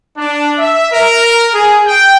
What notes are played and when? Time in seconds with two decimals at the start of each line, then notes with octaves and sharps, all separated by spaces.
0.18 D4
0.59 E5
0.93 A#4
1.54 G#4
1.86 G5